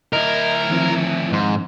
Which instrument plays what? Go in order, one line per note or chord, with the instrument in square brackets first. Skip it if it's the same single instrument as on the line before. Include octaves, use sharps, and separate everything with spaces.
[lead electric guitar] D2 E4 [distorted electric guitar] A#4 [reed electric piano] D#5
[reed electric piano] D#3 F3 C4
[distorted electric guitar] G#2